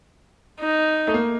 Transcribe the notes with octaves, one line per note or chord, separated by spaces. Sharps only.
D#4
A3
A#3